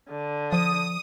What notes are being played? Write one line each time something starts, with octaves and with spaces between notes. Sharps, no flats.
D3
F3 D#6